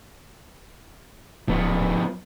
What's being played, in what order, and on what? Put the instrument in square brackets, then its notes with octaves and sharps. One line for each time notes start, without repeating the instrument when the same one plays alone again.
[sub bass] D1 [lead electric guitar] F3 B3